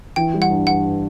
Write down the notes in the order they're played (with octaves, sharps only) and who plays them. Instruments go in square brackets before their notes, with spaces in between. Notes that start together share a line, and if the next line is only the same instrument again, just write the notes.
[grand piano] E3 [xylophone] G5
[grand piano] G3
[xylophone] F#5
[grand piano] G2
[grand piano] G2 [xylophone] F#5